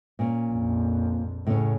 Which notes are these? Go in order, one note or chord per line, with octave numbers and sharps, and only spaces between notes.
A#2 C#4
A#1 F2
A2 C#3 C#4